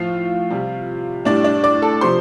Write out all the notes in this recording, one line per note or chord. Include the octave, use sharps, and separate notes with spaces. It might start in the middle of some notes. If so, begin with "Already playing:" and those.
Already playing: A2 F3 F4 F5
C3 G3
A2 G3 D4 D5
D4 D5
D5 D6
A4 A5
C3 F3 C5 C6